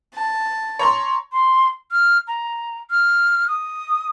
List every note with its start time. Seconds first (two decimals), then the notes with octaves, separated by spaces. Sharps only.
0.14 A5
0.79 C#5 A#5 C6
1.32 C6
1.92 F6
2.28 A#5
2.90 F6
3.48 D#6